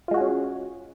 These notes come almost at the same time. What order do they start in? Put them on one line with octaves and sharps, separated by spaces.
F4 G#3 F#4 G#4 C#4